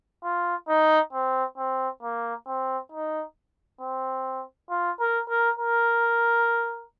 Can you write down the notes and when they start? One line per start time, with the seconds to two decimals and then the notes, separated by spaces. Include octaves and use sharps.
0.24 F4
0.68 D#4
1.13 C4
1.58 C4
2.03 A#3
2.47 C4
2.92 D#4
3.81 C4
4.70 F4
5.00 A#4
5.29 A#4
5.59 A#4